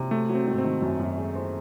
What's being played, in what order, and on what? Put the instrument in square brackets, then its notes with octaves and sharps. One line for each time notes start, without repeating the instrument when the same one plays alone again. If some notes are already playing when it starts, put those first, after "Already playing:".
Already playing: [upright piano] C3
[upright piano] F#3 [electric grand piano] A3
[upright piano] F#3
[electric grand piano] C4
[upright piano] G#2
[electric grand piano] C4
[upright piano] D#3
F#2
F#2
G#3
C4